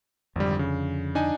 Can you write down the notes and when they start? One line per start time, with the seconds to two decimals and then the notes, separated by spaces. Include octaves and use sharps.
0.36 G#1 F2 D3 G3
0.59 C#3
1.15 D4 D#4 G#5